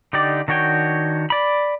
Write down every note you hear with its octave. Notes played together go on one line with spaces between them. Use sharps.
D3 D#4 G4 D5
D#3 D4 F#4 C#5 G5
D5 B5